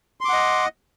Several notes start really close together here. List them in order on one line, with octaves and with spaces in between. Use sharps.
C6 D6 F#5 D#5